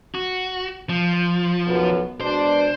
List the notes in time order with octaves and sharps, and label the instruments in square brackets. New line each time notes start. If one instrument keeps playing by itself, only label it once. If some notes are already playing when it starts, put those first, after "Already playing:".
[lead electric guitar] F#4
F3
[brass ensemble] B1 F#2 B3
[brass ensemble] B2 G#3 D4 [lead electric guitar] C5